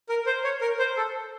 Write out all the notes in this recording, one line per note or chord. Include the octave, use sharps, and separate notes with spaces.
A#4
C5
C#5
A#4
C5
A4